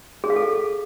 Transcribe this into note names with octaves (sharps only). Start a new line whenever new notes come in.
G#4
F5
A4